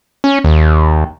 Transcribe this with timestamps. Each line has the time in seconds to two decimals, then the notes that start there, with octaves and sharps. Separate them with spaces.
0.24 C#4
0.44 D#2